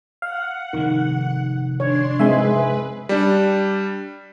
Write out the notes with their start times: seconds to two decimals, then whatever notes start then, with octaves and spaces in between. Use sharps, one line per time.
0.22 F5 F#5
0.73 F1 G#2 D#3
1.80 D4 C#5 C6
2.19 G#3 C4 B4 E5 G#5 C6
3.09 G3 D4